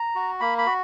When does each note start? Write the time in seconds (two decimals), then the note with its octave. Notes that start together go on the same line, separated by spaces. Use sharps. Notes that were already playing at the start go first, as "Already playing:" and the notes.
Already playing: A#5
0.15 F#4
0.40 A#3 B5
0.58 B5
0.66 F#4